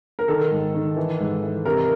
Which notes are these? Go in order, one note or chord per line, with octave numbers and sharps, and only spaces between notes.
A#4
D#3 A4
G#2
D#3
E3
G#2
E3
C3 A#4